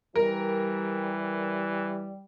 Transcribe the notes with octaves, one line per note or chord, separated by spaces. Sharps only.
E3 G3 A#4